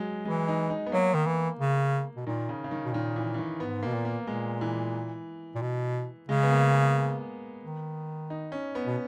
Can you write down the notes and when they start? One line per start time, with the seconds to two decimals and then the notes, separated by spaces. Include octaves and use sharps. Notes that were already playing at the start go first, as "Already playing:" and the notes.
Already playing: F#3 G#3
0.25 E3 G#3
0.48 D#4
0.70 D#4
0.87 B3
0.92 F#3 A#3
1.14 D#3
1.26 E3
1.59 C#3
2.17 B2
2.27 A#2 D#3
2.49 C#3
2.64 C#3
2.71 D#3
2.85 B2
2.93 A#2 D#3
3.16 E3
3.34 E3
3.38 D#3
3.60 G#2 B3
3.83 B2 A#3
3.94 A#2
4.05 A#3
4.27 A#2 G#3
4.61 E3
5.55 A#2
5.62 B2
6.29 C#3 G#3
6.43 B3
6.51 A#3
6.73 B3
7.64 D#3
8.30 D#4
8.52 C#4
8.75 B3
8.87 B2